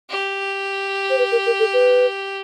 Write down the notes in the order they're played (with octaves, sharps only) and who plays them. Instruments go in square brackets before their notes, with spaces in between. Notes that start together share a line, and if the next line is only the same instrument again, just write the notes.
[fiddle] G4
[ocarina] C5
B4
A#4
A#4
A4
B4